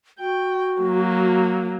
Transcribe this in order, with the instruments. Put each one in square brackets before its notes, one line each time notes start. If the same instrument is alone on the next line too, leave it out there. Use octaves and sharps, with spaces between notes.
[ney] F#4 [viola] G5
[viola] F#3 A#3